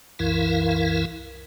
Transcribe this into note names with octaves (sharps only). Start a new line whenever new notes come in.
C2 F#2 E3 E4 A#4 F5